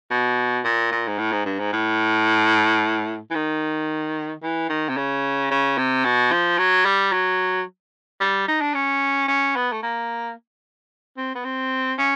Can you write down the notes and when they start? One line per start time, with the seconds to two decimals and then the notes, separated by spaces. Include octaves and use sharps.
0.11 B2
0.64 A#2
0.92 A#2
1.08 G#2
1.18 A2
1.32 G#2
1.45 G2
1.59 G#2
1.73 A2
3.30 E3
3.35 D#3
4.43 E3
4.69 D#3
4.89 C3
4.97 C#3
5.51 C#3
5.78 C3
6.05 B2
6.31 F3
6.58 F#3
6.85 G3
7.13 F#3
8.20 G3
8.48 D#4
8.61 D4
8.74 C#4
9.28 C#4
9.56 B3
9.72 A3
9.83 A#3
11.17 C4
11.35 B3
11.44 C4
11.98 C#4